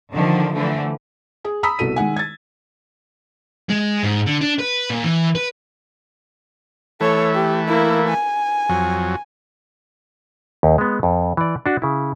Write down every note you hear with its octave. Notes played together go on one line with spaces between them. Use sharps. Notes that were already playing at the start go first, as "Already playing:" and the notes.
D3 D#3 F3
D3 E3 F3 A3
G#4
A#5 B5 D#6 E6 B6
C2 B2 F#4 A4 D#7
D#3 G#3 F#5 G#5
G#6 A6
G#3
G#2
D3
D4
B4
A#2
E3
B4
E3 A3 A4 C#5
G4
A#3 E4
G#5
F2 F#3
D#2
G#3 B3
F2
E3 D5
D4 F#4
C#3 E4